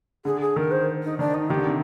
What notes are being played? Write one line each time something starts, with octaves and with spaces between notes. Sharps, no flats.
D3 G#4
G#4
D#3 A#4
C5
D#4
D#3 D4
D#4
D#3 G4
D3
C3